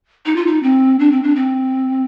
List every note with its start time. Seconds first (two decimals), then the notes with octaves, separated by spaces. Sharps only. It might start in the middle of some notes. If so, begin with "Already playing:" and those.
0.26 D#4
0.36 F4
0.47 D#4
0.63 C4
0.99 D4
1.12 C4
1.23 D4
1.36 C4